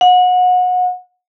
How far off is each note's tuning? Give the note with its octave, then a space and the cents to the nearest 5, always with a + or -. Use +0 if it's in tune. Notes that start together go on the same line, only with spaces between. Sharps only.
F#5 -30